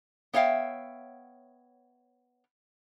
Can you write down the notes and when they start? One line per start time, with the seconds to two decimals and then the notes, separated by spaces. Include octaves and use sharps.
0.33 B3 C#5 E5 F5 G5